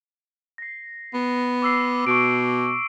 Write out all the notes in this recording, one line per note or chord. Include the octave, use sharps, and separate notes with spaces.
A#6 C7
B3
D6 E6 C7
B2 C#6 D7